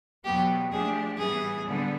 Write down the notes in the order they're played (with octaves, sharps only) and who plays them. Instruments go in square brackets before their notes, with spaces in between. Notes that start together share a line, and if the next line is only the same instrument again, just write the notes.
[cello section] E2 B2 F#3 B3 [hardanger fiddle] G4
[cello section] F3 A3 D4 G4 [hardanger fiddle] G#4
[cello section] A2 E3 G3 B3 [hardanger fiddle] G#4
[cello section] D3 G3 B3